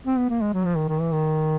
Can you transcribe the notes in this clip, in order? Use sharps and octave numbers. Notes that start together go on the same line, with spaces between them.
C4
B3
A#3
G#3
F#3
F3
D#3
D#3
E3
D#3